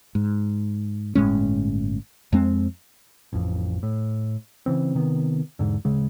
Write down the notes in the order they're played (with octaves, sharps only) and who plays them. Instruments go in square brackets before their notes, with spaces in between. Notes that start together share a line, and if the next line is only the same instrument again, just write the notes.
[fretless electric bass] G#2
G1 A2 G#3 C#4
F2 G#3 C4
[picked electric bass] A1 F2
A2
C#3 E3 C4
C3 D#3 B3
E1 A#1 G#2 D3
D1 C#3 G#3